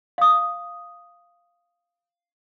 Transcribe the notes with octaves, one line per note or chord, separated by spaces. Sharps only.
F5 D#6